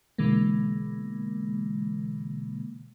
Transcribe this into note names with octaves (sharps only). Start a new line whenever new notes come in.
B2 D3 E3 G#3 A#3